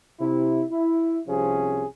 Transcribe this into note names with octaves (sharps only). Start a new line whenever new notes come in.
C3 E4
E4
C2 C3 F3 C#4 G#4